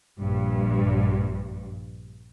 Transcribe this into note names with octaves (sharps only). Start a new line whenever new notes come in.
A#1 G2